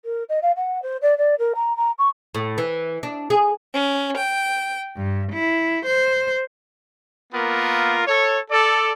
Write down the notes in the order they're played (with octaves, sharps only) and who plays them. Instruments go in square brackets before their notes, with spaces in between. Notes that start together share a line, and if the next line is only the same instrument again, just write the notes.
[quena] A#4
D#5
F5
F#5
C5
D5
D5
A#4
A#5
A#5
C#6
[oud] A2
E3
D4
G#4
[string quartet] C#4
G5
G2
E4
C5
[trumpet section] A#3 B3 F4 A#4
A4 C#5
A4 D5